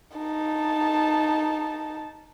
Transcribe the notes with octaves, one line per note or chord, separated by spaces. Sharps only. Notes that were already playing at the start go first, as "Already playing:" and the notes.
D#4 A5